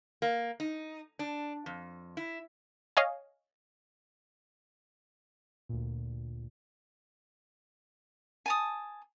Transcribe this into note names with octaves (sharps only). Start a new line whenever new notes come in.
A#3
D#4
D4
F2
E4
C#5 D#5 F5 G#5
D2 A#2
G#5 A5 D#6